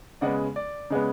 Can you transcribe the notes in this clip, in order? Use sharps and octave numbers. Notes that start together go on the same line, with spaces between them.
C#3 G#3 B3 D5 F#5
D5
C#3 G#3 B3